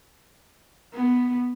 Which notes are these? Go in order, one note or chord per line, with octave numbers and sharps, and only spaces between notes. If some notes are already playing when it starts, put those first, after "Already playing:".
B3